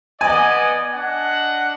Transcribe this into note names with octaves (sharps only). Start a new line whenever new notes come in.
B3 D5 D#5 G#5
D4 D#5 F#5